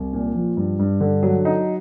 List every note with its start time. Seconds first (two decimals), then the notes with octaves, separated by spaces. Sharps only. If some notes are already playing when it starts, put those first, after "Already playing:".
Already playing: C2
0.13 A#2
0.35 F3
0.57 G2
0.79 G2
1.01 D3
1.23 F#3
1.45 D#4